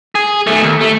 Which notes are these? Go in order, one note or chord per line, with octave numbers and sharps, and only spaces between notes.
G#4
B1 A3
D#2
A3